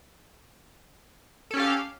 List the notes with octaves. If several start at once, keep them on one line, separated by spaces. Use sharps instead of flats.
C#4 G4 A4 F5